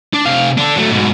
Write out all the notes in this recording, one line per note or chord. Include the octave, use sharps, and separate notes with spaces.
D4
C3 F5
D3 D4
F#3 A3
G#2 B2